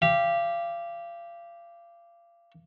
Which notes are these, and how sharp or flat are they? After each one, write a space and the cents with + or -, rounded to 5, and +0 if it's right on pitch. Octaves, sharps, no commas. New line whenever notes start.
G4 +0 F5 -30